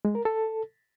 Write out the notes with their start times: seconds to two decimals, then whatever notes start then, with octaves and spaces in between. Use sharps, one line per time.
0.05 G#3
0.15 A#4
0.25 A4